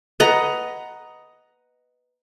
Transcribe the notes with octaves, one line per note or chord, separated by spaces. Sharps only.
B4 D#5 F#5 A#5